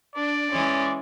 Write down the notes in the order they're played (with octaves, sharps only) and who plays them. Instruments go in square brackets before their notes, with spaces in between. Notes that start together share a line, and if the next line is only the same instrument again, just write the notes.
[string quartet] D4 [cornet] D5
[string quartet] E3 G#3 C#4